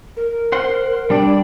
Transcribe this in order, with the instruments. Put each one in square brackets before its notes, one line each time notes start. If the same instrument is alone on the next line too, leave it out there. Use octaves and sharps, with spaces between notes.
[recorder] A#4
[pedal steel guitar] C5 F#5 C6
[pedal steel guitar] G3 D4 D5 [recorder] G5